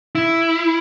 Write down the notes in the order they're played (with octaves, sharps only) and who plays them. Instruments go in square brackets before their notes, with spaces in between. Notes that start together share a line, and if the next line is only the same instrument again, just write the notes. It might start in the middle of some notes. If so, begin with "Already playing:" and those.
[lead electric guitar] E4